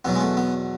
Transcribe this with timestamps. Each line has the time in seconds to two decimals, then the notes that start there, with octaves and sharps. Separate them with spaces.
0.05 E2 B2 F#3 B3
0.15 G#3
0.21 A3
0.37 B3